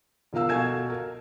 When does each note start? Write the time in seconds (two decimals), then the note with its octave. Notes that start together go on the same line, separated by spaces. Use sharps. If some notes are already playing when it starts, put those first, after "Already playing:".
0.33 E1 F3 A#4 F5 E6
0.49 B2 A4 F5 G#5 G#6 E7
0.90 A#4